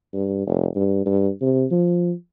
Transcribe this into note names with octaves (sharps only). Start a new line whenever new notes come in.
G2
F1
G2
G2
C3
F3